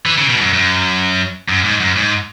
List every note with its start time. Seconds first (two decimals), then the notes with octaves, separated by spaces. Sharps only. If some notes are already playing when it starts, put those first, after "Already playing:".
0.06 E3
0.18 C#3
0.30 B2
0.35 G#2
0.41 F#2
0.53 F#2
1.49 F#2
1.64 G#2
1.80 F#2
1.96 G#2